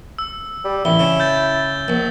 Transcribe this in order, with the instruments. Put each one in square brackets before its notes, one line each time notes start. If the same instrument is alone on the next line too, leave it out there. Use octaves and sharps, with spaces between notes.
[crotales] E6
[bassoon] G3
[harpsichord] A1 [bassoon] E4 [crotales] G7
[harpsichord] C#3
[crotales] G6 A6
[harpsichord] A#1